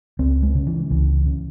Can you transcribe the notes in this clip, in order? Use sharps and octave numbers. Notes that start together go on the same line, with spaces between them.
C#2 C4
G#3
C#3
E3
C#2 E3
C#3